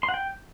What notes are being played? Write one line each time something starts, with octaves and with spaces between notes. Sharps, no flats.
C6
F#5
G5